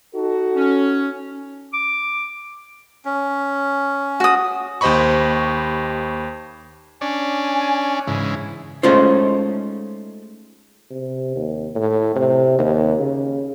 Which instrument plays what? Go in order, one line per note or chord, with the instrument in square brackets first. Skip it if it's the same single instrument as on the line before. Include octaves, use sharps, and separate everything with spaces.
[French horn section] D#4 F#4 A4
[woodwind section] C#4
[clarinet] D6
[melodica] C#4
[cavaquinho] F#4 D#6
[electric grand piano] D#2 G4 C5 D#5 B5 C#6
[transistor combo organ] C#4 D4 [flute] G#5
[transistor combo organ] G#2 C#3 E3
[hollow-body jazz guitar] G#3 A3 C#4 D#4 F4 C5
[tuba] C3
D#2
A2
C3
D#2
C#3